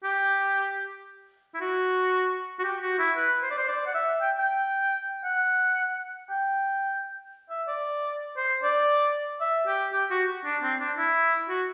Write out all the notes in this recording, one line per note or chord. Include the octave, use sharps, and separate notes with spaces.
G4
E4
F#4
F#4
G4
F#4
E4
B4
C5
D5
C5
D5
F#5
E5
G5
G5
F#5
G5
E5
D5
C5
D5
E5
G4
G4
F#4
D4
C4
D4
E4
F#4